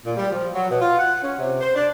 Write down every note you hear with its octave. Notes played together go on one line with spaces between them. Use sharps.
A#2
G3
F3
F#3
B2
F4
F#5
C#4
C3
C5
D4